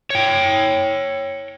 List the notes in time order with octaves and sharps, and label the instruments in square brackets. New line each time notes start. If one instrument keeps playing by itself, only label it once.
[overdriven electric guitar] C#5 G5